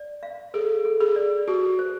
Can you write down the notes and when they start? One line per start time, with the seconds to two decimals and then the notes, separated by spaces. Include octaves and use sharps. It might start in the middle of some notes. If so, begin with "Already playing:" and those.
Already playing: D5
0.23 F5
0.54 G#4 A4
0.85 A4
1.00 G#4
1.16 D5
1.47 F#4 G4
1.79 C5